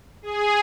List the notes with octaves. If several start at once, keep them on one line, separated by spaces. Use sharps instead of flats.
G#4